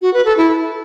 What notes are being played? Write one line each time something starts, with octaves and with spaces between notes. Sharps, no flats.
F#4
B4
A4
E4